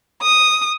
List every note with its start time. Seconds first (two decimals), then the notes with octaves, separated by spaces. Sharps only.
0.22 D#6